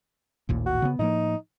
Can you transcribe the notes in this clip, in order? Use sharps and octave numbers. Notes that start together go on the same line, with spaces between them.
A1 D#2 A#2
F#4
C#3 B3
A2 F3 A#3 D#4